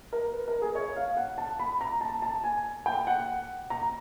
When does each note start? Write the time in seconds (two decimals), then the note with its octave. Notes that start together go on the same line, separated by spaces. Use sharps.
0.13 A#4
0.32 B4
0.48 A#4
0.62 G#4
0.75 C#5
0.96 F5
1.17 F#5
1.38 A5
1.59 B5
1.81 A#5
2.01 A5
2.22 A5
2.44 G#5
2.86 G5
3.07 F#5
3.70 A#5